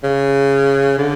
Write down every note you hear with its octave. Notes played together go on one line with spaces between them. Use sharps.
C#3
D3